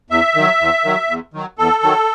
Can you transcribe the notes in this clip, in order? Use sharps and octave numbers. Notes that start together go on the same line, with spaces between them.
E2 E5
D#3 F#3
E2
D#3 F#3
E2
D#3 F#3
E2 A4
D#3 F#3